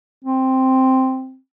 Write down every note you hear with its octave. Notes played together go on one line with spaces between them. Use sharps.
C4